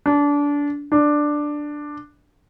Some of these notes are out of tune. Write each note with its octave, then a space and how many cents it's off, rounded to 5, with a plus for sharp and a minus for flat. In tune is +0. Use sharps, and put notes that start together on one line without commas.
D4 -25
D4 +5